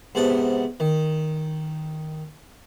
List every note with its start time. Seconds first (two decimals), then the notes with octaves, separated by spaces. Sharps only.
0.15 G#2 C3 B3 A5
0.80 D#3